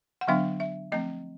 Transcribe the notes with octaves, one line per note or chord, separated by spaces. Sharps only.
F#5
D3 F#3 B3 D4 F5
E5
F3 A3 C4 D#5